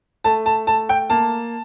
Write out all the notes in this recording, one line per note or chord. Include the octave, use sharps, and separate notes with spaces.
A3 A5
A5
A3 A5
G5
A#3 A5